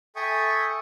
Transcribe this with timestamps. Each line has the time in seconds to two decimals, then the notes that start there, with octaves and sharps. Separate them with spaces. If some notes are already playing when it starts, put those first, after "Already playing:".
0.16 A4 E5 G5 G#5 C#6 D#6